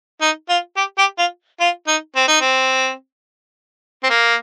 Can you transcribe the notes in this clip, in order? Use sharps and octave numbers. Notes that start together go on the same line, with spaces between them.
D#4
F4
G4
G4
F4
F4
D#4
C4
D#4
C4
C4
A#3